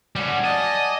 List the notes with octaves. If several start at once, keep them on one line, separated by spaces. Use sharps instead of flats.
G3 A3 C#4 F#4 F#5
D5 D#5 G#5 A5